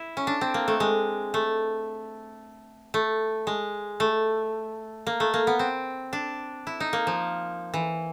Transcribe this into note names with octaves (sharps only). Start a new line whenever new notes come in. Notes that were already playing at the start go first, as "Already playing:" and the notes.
Already playing: E4
C#4
D4
C4
A#3
A3
G#3
A3
A3
G#3
A3
A#3
A3
A#3
B3
C4
D4
E4
D#4
A#3
F3
E3